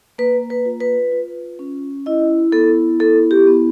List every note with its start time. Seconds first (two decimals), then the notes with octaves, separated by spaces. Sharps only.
0.18 A#3 B4
0.50 B4
0.65 F4
0.80 B4
1.12 F4
1.59 C#4
2.06 E4 D#5
2.52 B3 A4
2.99 E4 A4
3.31 G4
3.47 B3